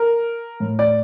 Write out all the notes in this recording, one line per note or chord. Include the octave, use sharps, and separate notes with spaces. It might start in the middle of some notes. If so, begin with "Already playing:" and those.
Already playing: A#4
A2
D5